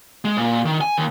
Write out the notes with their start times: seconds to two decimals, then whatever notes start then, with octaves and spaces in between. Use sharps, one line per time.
0.25 G#3
0.37 A#2
0.65 D#3
0.81 G#5
0.98 D#2